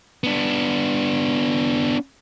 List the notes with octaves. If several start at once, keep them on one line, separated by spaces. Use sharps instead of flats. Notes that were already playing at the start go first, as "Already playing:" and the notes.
B3 D4